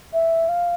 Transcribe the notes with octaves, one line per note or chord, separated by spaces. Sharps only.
E5
F5